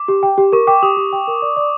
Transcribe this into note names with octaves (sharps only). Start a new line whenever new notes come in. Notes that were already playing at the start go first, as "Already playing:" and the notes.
Already playing: D6
G4
G5
G4
A#4 C#6
G5 D6
G4 D#6
G4
G5
A#4
D5
D5